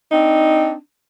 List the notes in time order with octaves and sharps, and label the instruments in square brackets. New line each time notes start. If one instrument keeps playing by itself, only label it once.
[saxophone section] C4 D4 D#4